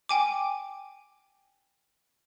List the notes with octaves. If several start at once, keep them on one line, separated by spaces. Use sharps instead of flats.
G5 G#5 D6